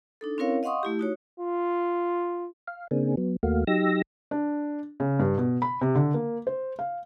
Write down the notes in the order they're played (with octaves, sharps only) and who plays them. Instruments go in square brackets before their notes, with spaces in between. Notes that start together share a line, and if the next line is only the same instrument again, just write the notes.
[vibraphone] D4 D#4 A4
C4 C#4 E4 A#4 C#5 F5
D#5 F5 F#5 C6 C#6 D#6
A3 E4 G4
D#4 F#4 C#5
[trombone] F4
[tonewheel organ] F5
C#3 A#3 C4 D4 G#4
F#3 B3
D#2 A3 A#3 F#4 F5
F#3 D#4 G4 E6 A#6
[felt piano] D4
C#3
G2
B2
B5
C3
D3
A#3
C5
F5